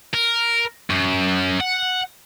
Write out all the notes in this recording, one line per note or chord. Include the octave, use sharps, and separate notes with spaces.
A#4
F#2
F#5